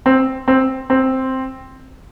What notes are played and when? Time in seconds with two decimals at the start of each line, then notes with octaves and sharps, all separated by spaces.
0.06 C4
0.48 C4
0.90 C4